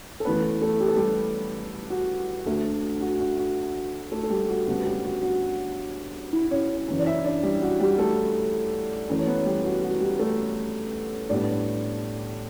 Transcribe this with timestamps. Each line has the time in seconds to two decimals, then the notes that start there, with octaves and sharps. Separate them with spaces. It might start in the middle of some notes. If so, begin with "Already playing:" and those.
0.20 A4
0.25 F#2 E3 A3 B3 B4
0.62 A3 A4
0.80 G4
0.88 A4
0.96 G3 G4
1.90 F#4
2.46 D2 D3 A3
3.01 F#4
3.20 F#4
3.38 F#4
4.12 A3 A4
4.23 A4
4.30 G3 G4
4.49 F#4
4.67 D2 C#3 G3 B3 F#4
4.85 G3 G4
5.04 F#4
5.22 F#4
6.33 E4
6.51 C#4 C#5
6.88 F#2 C#3 E3
6.99 D5
7.06 E4 E5
7.24 D4 D5
7.43 G3 G4
7.62 F#4
7.80 G3 G4
7.98 A3 A4
9.09 F#2 E3 A3
9.19 C#5
9.27 B3 B4
9.46 G3 G4
9.65 F#4
9.83 F#4
10.01 G3 G4
10.19 A3 A4
11.30 A2 G3 B3 D4 D5